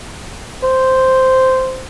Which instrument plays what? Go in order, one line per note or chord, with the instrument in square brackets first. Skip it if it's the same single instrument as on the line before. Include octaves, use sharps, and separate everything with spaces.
[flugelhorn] C5